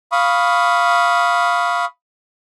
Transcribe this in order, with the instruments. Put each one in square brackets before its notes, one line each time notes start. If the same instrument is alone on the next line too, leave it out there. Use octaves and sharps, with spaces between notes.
[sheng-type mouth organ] F5 B5 C#6 D#6